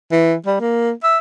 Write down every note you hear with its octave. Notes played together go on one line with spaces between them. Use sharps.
E3
G3
A#3
E5